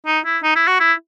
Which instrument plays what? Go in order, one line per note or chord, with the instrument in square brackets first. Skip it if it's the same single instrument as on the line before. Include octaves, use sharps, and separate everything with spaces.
[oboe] D#4
E4
D#4
E4
F#4
E4